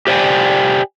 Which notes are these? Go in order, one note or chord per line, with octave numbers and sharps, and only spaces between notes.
G4 C5 D5 G5 G#5